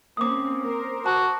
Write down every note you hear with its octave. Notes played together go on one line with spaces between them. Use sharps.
A#3 C4 C#4 D6 D#6
A#4 C5
F#4 A5